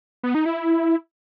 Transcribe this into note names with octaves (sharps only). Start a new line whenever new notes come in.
B3
D#4
E4